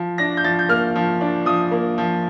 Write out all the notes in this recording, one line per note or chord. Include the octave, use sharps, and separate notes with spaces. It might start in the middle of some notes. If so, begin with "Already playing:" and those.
Already playing: F3
D4 A#6
G6
F3 A6
G6
A#3 F6
F3
D4
F3 D#6
A#3
F3